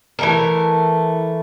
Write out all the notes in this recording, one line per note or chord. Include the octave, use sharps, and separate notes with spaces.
E3 A3 A#4